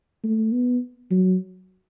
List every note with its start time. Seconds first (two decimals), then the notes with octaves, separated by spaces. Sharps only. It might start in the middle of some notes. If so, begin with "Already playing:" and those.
0.24 A3
0.52 B3
1.11 F#3